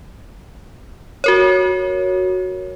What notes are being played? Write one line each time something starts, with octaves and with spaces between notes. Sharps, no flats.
F#4 A#4 C#5